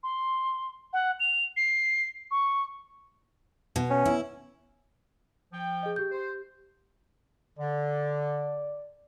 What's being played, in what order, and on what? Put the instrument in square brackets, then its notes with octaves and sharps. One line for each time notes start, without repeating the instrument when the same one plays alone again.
[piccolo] C6
F#5
F7
C7
C#6
[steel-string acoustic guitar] B2
[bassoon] C#4
[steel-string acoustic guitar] E4
[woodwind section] F3 G5
[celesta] G#4 D#5
G4 G6
[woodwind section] C5
[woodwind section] D3 [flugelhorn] D5